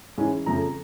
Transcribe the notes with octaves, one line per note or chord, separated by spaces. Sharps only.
G#2 E3 G#3 C#4
F2 C#3 F3 A3 A#5